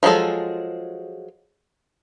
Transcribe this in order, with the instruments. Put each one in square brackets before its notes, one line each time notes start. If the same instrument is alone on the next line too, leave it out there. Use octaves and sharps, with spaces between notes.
[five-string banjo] F3 F#3 G#3 G#4 A4